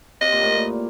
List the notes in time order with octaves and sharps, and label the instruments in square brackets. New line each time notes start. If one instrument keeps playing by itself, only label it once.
[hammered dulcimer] C3 [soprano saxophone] D#5
[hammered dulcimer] A#2
A2
A#2